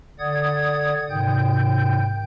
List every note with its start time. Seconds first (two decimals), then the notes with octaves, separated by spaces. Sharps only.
0.19 D3 D5 F#5 D#6 G#6
1.10 G#2 C3 D#3 G5 G6